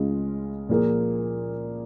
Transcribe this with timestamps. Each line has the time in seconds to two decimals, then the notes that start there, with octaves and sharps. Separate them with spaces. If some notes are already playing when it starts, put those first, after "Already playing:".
Already playing: C#2 C#3 G#3 C#4 F4
0.69 A#2 F3 A#3 F4 G#4